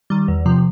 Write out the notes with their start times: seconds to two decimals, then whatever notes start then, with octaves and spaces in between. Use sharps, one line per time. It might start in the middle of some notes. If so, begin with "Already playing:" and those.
0.10 D#3 G3
0.28 E2
0.46 C3 F3